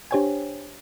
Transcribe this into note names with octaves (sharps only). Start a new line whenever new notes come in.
D4 G4 C5 C#5 G5 G#5